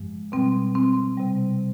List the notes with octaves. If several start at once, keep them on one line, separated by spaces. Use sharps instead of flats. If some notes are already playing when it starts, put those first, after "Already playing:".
Already playing: G2 F3 G#3
B2 G3 C4
C4
C3 G3